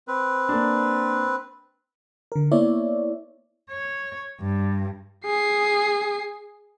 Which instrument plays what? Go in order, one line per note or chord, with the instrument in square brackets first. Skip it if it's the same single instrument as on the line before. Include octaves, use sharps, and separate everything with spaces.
[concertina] C4 B4
[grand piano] A#3 D4
[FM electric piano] D3 A#4
A#3 B3 E4 C#5 D5 E5
[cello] C#5
G2
[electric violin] G#4 C7